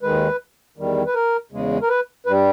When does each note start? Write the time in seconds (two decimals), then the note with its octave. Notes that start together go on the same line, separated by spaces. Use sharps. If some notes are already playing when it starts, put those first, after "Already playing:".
0.03 D#2 D#3 G#3 B4
0.77 E2 D#3 G3
1.06 B4
1.14 A#4
1.52 E2 C#3 G#3
1.82 A#4
1.89 B4
2.26 G2 G3 B4